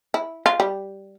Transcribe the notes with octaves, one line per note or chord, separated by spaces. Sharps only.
E4
F4
G3